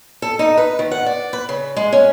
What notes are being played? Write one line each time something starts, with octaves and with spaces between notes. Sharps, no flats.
A4
D#4
B4
D#3
F#5
D5
B4
C#3
G#3
C#4